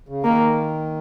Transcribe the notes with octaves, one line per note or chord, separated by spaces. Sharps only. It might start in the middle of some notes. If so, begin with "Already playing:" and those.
C#3
D#3 A#3